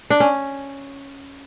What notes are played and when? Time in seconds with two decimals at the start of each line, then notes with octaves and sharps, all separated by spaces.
0.10 D4
0.20 C#4